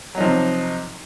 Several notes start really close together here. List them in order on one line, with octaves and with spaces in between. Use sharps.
F#3 D#4 F3 C3